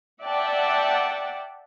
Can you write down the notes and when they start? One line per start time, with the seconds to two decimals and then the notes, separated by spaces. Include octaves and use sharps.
0.23 D5 E5 F#5 G5 A5